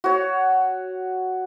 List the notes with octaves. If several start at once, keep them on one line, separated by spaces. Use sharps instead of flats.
F#4 C#5